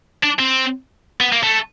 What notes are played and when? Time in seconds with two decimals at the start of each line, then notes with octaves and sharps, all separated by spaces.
0.24 D4
0.39 C4
1.20 B3
1.32 A#3
1.43 A3